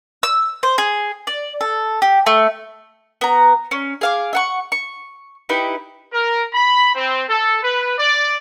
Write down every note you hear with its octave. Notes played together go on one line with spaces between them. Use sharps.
E6
C5
G#4
D5
A4
G4
A3
B3 A#5
C#4
G#4 F5 D6
E5 F#5 C#6
C#6
D#4 E4 G4 B4
A#4
B5
C4
A4
B4
D5